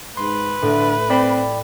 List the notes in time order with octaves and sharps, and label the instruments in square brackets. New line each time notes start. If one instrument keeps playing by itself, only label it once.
[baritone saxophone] G#2 [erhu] B4 [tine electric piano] C6
[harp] A2 [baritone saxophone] D3
[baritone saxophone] C4 [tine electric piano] D5 G5 B5